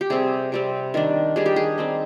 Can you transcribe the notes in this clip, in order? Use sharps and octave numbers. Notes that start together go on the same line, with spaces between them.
G4
C3 G3 C4 G#4
C3 G3 C4
D#3 G3 D4
D#3 G3 D4 G#4
G4
G#4
G3 C4 D#4